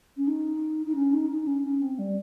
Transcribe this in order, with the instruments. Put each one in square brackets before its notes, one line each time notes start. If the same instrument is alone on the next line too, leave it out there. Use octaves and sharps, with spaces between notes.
[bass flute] C#4
D#4
D#4
C#4
D#4
D#4
C#4
C#4
C4
G3